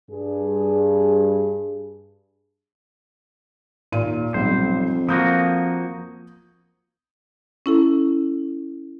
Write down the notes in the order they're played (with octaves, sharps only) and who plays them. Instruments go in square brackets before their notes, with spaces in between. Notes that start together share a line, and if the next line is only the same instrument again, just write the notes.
[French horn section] G2 G#4
[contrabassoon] D#2 [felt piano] A#2 D#7
[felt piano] B1 G3 [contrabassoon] F2 [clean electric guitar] C5
[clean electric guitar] F3 A#3 F#4 [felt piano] D#6 G6 A#6
[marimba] C#4 E4 A4